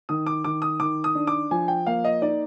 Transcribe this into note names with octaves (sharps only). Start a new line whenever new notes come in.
D#3 D#6
D6
D#3 D6
D#6
D#3 D6
D#6
D4
D6
F3 G#5
G5
A#3 F5
D#5
D#4 D5